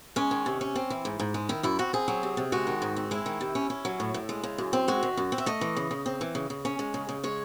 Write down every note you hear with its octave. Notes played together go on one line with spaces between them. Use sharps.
G#3 C#4
D#3
C3
C#4
C4
E3
G#2
G#2
G#3
D#3 E4
F#2 E4
C4 F#4
C4 G#4
F#3
C3
C3
G#3 F#4
D#3
G#2
C4
G#3 E4
D#3
C3
C#4
C#4
F#3
A2
A2
G#3
C#3
F#2
C4
G#3 F#4
D#3
F#2
C4
E5
A3 D#5
E3
C#3
C#3
C4
E3
C#3
C#3
C#4
G#3
C#3
C#3
G#3 C#5